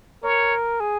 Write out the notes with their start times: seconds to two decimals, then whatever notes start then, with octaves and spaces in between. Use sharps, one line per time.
0.24 A#4 C#5
0.80 G#4